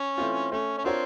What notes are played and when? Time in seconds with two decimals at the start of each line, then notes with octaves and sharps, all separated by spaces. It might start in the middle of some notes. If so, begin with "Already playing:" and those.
Already playing: C#4
0.18 E3 A3 C4 F4
0.51 A3 C#4
0.78 C#4
0.84 C4 D4 F4 A#4 C#5